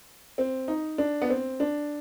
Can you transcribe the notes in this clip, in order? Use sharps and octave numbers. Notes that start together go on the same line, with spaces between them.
C4
D#4
D4
B3
C4
D4